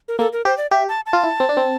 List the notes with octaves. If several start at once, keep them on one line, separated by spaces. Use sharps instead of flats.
A#4
A#3 A4
A#4
G4 C5
D5
G4 E5
A5
A5
F4
E4
C4
D4
C4